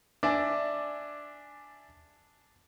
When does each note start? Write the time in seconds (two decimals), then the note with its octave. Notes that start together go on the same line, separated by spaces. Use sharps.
0.23 D4 D5 E5 G#5